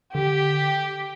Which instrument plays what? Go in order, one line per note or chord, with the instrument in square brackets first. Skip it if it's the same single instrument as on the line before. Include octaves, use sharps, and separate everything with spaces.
[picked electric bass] D3 [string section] G4